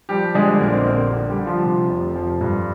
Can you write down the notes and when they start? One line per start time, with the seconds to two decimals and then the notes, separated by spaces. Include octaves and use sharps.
0.09 F3 G3 G4
0.34 D3 G#3 G#4
0.61 A#1 A#3 A#4
0.73 C4 C5
0.86 A#1 A#3 A#4
1.12 D3
1.30 G3 G4
1.38 D3
1.46 F3 F4
1.63 C3
1.89 F1
2.16 F3
2.41 G2